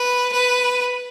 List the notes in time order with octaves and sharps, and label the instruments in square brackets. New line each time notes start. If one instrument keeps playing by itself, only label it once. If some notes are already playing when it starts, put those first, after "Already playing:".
Already playing: [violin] B4
B4